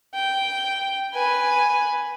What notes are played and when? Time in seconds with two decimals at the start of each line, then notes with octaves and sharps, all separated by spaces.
0.14 G5
1.14 B4 G#5